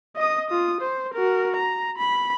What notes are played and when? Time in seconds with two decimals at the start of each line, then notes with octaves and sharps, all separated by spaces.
0.16 D#5 D#6
0.50 F4 D#6
0.81 C5
1.14 F#4 A#4
1.56 A#5
1.98 B5